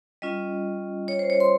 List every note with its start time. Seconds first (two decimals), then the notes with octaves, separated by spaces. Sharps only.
0.22 G3 C#4 F4 D#5
1.08 C#5
1.19 C5
1.30 C#5
1.40 C6